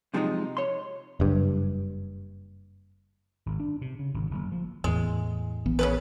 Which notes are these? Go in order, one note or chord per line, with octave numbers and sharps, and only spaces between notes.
F#2 C3 F3 G#3 D4 D#4
C#5 C6
F#1 G2
G#1
D4
C3
C#3
G#1
F#1
F3
E2 A2 E3 G#3
A#1 E3 B3
C#3 G#3 B4